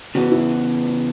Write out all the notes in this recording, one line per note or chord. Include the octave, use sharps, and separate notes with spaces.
C#3 E3 B3 F#4
E4